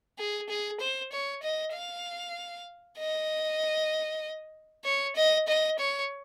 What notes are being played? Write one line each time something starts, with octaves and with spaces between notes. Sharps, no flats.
G#4
G#4
C5
C#5
D#5
F5
D#5
C#5
D#5
D#5
C#5